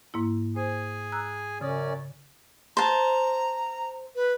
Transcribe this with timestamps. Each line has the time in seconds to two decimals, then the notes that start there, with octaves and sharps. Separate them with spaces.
0.14 G#2 A#3 E4
0.56 G#4 C5 G#5
1.12 A#5 E6 F#6
1.61 F#2 C#3 C#4 D5 D#6
2.77 C5 A5 A#5
4.15 B4